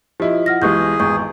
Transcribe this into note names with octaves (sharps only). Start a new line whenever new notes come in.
F3 E4 G4 D#5
F#5 F6 A#6
B1 E3 G#3 G4 G#4 C#6 G6
G#1 E2 G#3 C#6 G6